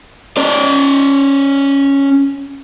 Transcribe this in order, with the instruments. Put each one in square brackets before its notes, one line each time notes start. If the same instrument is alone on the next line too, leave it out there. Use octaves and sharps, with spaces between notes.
[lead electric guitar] C#4 D5